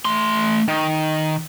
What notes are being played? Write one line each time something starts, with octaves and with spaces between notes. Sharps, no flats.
A3 C6
D#3